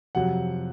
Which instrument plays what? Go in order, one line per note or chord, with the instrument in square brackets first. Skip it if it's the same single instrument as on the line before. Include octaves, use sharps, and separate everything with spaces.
[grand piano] F2 C3 F#3 F#5